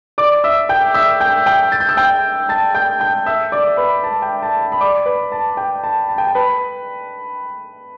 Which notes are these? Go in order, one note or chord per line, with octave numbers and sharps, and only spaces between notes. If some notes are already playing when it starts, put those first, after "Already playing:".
D5 D6
E5 E6
G5 G6
E5 E6
G5 G6
G5 G6
A6
G6
E6
G5 G6
A5 A6
G5 G6
G5 G6
E5 E6
D5 D6
B4 B5
A5
G5
A5
A5
B5
D5 D6
B4 B5
A5
G5
A5
A5
G5
A5
B4 B5